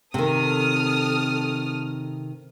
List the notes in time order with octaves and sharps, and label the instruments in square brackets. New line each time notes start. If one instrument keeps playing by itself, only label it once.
[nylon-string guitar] C3 D#3 [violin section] A4 D#6 F6